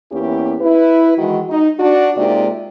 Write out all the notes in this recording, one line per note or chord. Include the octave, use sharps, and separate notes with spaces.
E2 A#3 B3 C#4 E4 G4
E4 B4
D#3 E3 G#3 F#4
D#4
D4 F#4
C3 G#3 A#3 D#4 F4 D5